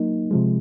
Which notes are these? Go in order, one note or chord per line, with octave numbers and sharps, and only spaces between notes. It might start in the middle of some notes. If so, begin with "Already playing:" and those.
Already playing: F#3 A#3 D#4
C3 F3 G#3